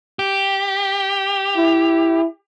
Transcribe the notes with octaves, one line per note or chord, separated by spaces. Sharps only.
G4
E4